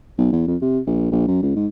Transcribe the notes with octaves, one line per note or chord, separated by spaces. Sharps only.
B1
E2
F2
C3
A#1
A#1
F#2
C#2
G#2